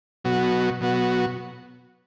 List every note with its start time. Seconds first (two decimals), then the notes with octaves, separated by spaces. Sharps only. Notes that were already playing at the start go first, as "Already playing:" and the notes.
0.24 B2 F#3 B3 F#4
0.81 B2 F#3 B3 F#4